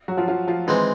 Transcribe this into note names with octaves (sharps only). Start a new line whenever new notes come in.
F#3 F#4
F3 F4
F3 F4
F3 F4
D#3 E3 G#3 C4 D#4